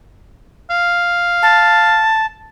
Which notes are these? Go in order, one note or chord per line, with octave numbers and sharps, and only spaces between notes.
F5
A5